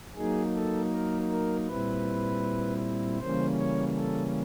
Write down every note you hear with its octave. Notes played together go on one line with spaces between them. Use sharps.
F#3 A#3 D#4 G#4
A4
A#4
A#4
A#2 G3 C4 E4 B4
C#3 E3 G3 A#3 C#4 C5
C#5
A4